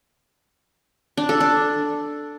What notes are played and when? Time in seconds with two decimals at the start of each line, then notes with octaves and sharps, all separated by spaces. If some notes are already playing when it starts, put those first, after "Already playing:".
1.17 D4
1.29 A4
1.40 D4